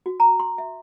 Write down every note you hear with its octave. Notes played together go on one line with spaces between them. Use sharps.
F#4
A#5
C6
E5